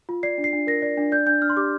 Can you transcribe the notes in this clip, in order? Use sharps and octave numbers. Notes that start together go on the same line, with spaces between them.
F4
D5 C7
D4
C7
D4
A#4 A#6
D5
D4
D5 G6
D4 G6
D4 F6
C6
G4 D6